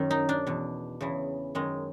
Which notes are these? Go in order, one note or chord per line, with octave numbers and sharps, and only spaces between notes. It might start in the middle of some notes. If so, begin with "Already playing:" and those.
Already playing: F#2 D#3
D#4
D4
E2 B2
E2 C#3 E3
F#2 D#3 G#3